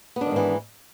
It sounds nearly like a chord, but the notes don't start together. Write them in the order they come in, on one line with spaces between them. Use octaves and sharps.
B3 D4 D#3 G#2 E3